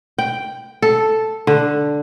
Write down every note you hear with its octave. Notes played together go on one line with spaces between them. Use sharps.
G5
A4
D3